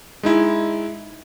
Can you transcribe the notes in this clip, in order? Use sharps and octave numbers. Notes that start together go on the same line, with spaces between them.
G#3 D#4 E4